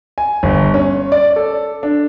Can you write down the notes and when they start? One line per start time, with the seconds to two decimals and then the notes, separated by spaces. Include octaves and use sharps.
0.18 G#5
0.43 G1
0.74 C#4
1.12 D5
1.36 A4
1.83 D4